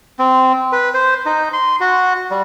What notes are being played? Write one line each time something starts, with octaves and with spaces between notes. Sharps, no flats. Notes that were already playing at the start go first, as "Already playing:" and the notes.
C4
B4
C5
D#4
C6
F#4
G3